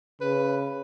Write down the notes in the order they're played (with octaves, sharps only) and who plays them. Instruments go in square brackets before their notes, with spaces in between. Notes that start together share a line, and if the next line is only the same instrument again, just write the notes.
[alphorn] C#3 [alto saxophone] B4